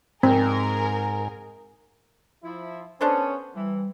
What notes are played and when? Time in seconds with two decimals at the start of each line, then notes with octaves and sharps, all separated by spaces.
0.23 G#2 C4 G#4 A#4
2.43 F3 E4
3.01 B3 C#4 D4 A4 C5
3.56 E3 G3